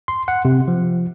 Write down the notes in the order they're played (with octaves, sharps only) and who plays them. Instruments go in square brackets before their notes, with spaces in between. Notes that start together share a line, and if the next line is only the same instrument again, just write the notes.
[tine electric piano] C6
F#5
C3
F3